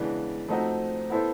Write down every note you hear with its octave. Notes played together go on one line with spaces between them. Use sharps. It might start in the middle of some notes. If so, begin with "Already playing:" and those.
Already playing: C#3 E3 G#3 B3 D4
F3 A3 C4 D#4 F#4
B3 E4 A4 C5